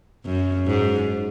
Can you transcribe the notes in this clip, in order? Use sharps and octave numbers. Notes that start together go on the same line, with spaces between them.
F#2
G#2